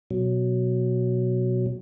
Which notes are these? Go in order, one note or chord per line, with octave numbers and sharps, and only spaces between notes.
B2 F#3